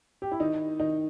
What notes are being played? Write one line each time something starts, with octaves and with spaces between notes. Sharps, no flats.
G4
E4
D#3 D#4
D#3 D#4